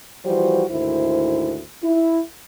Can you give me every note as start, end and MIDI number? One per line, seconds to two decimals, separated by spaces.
0.25 0.64 52
0.25 0.64 53
0.25 0.64 55
0.25 0.64 66
0.25 0.64 72
0.69 1.61 38
0.69 1.61 44
0.69 1.61 51
0.69 1.61 64
0.69 1.61 72
1.83 2.21 64